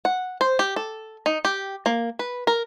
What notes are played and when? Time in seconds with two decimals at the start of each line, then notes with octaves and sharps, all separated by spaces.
0.05 F#5
0.41 C5
0.59 G4
0.76 A4
1.26 D#4
1.45 G4
1.86 A#3
2.19 B4
2.47 A#4